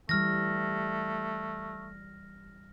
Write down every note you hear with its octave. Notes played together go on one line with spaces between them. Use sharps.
E3 G3 A3 F6 A#6